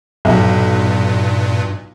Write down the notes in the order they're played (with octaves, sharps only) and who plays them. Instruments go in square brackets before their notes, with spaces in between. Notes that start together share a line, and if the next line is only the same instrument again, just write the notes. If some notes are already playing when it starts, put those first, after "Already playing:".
[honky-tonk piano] B1 [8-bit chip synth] G2 A#2